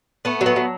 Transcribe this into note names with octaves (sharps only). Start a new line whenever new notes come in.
A3 B3
F#3
B3
F#3